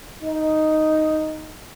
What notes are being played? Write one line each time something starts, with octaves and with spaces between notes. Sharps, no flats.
D#4